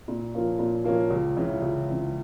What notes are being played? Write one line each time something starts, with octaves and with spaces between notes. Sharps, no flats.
A#2
F3 A#3 C#4 F4
A#2
F3 A#3 C#4 F4
C#2
C#3 E3
C#2
C#3 E3